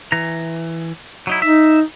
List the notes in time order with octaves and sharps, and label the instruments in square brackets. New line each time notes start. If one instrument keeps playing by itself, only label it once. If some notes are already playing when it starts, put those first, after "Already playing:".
[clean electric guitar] E3 A#5
F#3 D#4 E4
[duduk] D#4 [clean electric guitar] E5